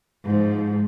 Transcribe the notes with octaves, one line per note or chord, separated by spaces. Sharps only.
G#2 F3